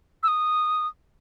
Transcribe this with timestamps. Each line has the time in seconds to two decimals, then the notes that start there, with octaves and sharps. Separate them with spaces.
0.23 E6
0.28 D#6